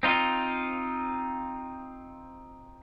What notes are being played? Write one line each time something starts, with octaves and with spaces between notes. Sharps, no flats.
C4 D#4 F4